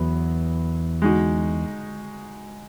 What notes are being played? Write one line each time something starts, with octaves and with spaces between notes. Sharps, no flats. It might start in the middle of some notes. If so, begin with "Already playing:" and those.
Already playing: E2 F#3 B3
G#3 D#4 F#4